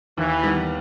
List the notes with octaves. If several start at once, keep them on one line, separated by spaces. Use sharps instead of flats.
D#2 E3
D#3 G3 B3